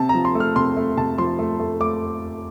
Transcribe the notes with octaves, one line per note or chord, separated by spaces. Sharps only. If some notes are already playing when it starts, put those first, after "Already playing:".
Already playing: C3 A5
A#5
F3
C6
A3
F6
C3 C6
A3
C3 A5
F3 C6
A3
A3
A3 D6